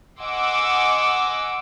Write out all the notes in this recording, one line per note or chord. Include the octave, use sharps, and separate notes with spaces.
D#5 F#5 G#5 C6 D6 E6